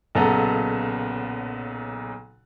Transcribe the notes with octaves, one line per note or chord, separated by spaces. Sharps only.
B1 A#2 C#3 B3 A4 A#5